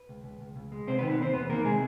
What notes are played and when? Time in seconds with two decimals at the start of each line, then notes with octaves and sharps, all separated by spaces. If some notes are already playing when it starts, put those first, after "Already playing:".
Already playing: B4
0.09 C#2
0.24 C#2
0.41 C#2
0.56 C#2
0.72 G#3
0.87 C3 C4 C5
0.98 B3 B4
1.02 D#3
1.10 B3 B4
1.19 C3 C4 C5
1.33 E2 B3 B4
1.49 D#3 A#3 A#4
1.65 C3 G#3 G#4